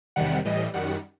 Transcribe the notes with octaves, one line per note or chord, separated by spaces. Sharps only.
E2 C3 D#3 G3 F#5
A2 E3 G3 D#5
F#2 D#3 G3 F#5